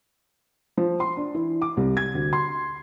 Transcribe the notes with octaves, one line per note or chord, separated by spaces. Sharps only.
F3
C6
D4
E3
D6
C2
G#6
D2
C6